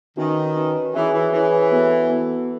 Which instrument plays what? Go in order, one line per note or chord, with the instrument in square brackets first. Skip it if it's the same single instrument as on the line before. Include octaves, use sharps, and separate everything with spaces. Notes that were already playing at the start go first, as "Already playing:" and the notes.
[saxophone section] D#3 [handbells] C#4 F#4 B4 E5
[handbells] C#4 F#4 B4 E5
[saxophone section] E3 [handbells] C#4 G#4 C#5 G#5
[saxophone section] E3
[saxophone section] E3 [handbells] C#4 G#4 C#5 G#5
[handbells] B3 F#4 A4
B3 F#4 A4